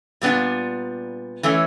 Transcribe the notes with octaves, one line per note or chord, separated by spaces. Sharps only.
A#2 G3 B3 D4 F4
E3 A3 C#4